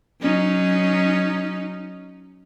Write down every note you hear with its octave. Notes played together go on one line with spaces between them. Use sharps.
F#3 C#4 D#4